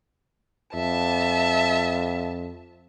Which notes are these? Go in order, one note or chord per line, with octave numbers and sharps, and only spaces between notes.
F2 E5 A5